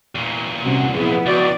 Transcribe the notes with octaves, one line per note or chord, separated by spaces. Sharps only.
E2 A#2
C2 C3 C#4 F#4
F3 B3 E4 G#4
C#2 F#4 D5